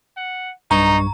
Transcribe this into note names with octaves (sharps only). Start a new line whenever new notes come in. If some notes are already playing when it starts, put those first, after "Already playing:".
F#5
B1 G2 D#4 A#5 C#6